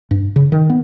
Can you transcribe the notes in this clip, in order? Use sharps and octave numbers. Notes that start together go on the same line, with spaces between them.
G2
C#3
D#3
B3